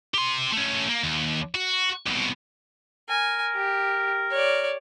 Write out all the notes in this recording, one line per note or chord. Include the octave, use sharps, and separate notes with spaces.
G4 C6
A3 C#4
A#3
D#2
F#4
C2 B2
A#4 G#5
G4
C#5 D5